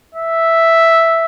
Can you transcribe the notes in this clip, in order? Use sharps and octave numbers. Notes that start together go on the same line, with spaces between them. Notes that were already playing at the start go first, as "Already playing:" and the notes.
E5